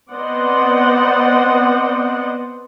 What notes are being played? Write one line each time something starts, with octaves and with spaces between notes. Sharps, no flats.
B3 C4 C5 D5 D#5 F#5